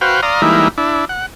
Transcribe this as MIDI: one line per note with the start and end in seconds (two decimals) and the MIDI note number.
0.01 0.21 66
0.01 0.21 71
0.01 0.21 72
0.01 0.21 77
0.01 0.21 79
0.23 0.41 74
0.23 0.41 77
0.23 0.41 82
0.23 0.41 84
0.23 0.41 87
0.42 0.68 52
0.42 0.68 55
0.42 0.68 56
0.42 0.68 58
0.42 0.68 63
0.42 0.68 64
0.78 1.05 62
0.78 1.05 64
1.09 1.26 78